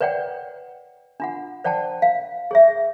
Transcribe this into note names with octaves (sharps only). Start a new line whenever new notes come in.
B4 C#5 D5 F#5 G5
D4 F4 F#5
C5 D5 F#5 G5 A5
F5
G#4 C#5 E5